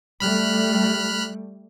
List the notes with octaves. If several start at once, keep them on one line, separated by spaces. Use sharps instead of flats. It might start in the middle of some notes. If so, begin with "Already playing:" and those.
G3 A3 B5 F6 F#6